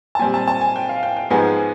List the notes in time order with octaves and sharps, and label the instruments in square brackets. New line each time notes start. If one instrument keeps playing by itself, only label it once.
[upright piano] A5
[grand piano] A#2 G3 C4 [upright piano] G#5
[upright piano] A5
A5
G#5
G5
F5
G5
G5
[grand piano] G#2 F3 G#3 B3 [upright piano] G#5